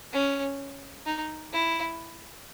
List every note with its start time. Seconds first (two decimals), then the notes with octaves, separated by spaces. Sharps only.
0.13 C#4
1.06 D#4
1.53 E4